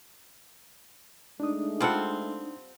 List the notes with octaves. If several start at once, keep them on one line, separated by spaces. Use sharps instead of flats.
G#3 A3 D4 D#4 D#6
G3 C4 F4 A4 F#5